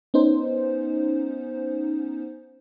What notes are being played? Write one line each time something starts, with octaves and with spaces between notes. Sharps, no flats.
B3 C#4 D#4 C5